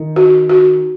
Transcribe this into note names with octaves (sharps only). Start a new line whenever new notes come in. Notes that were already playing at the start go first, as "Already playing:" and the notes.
Already playing: D#3
F#4
F#4